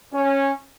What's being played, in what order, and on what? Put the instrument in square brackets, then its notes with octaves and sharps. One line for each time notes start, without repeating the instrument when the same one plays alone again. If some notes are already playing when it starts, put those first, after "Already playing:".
[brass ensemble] C#4